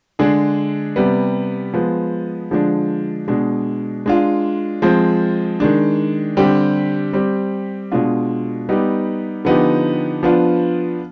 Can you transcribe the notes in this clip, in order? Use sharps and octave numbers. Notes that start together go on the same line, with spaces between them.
D3 G#3 D4 G#4
C3 G3 B3
F3 G#3 B3
D3 F3 G#3 D4
B2 G#3 D4
G#3 D4 F4
F3 G#3 C4
D#3 G#3 D4
D3 G3 C4 G4
G3 C4 G4
B2 G#3 D4 F4
G3 B3 D#4 G4
D3 F3 B3 D#4 G4
F3 B3 D4 F4